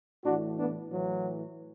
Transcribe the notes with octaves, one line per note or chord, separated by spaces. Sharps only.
A2 E3 D4 F#4
B3 D4
A2 E3 F#3